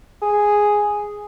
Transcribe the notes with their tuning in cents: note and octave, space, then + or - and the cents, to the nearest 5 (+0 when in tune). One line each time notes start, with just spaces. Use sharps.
G#4 +0